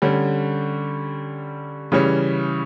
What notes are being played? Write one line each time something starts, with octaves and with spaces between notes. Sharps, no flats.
D3 G3 C#4
C#3 E3 G3 C#4